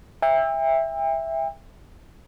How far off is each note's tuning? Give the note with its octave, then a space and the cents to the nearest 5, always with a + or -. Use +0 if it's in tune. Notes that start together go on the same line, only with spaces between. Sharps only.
E5 +0 G5 +40